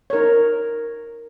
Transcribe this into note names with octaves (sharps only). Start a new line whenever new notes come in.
D#4 A#4 C#5